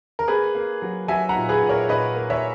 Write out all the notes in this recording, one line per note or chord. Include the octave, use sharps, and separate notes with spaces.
A#4
A#3 G#4 B4
A#3
F#3
F#3 E5 G#5
F#5 A#5
A#2
G#4 B4
A#2
A#4 C#5
A#2 B4 D#5
A#3
C#5 E5